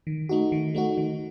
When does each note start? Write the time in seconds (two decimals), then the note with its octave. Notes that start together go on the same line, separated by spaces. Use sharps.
0.07 D#3
0.29 A3 D#4 F#4
0.52 D#3
0.75 A3 D#4 F#4
0.98 D#3